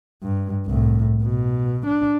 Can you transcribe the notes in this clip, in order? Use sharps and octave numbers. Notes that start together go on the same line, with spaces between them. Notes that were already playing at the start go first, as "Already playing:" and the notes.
G2
C2 A2
B2
D4